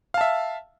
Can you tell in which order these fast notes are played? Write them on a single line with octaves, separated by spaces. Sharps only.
F5 A5 E5